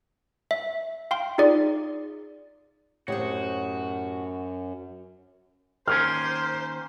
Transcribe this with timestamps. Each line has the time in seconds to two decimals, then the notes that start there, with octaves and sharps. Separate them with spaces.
0.51 E5
1.11 F5 G5 C6
1.38 D#4 F4 G#4 D5
3.08 F#2 A2 F#4 G4 C5 C#5 D#6
5.88 D#3 A#3 C#4 C5 F6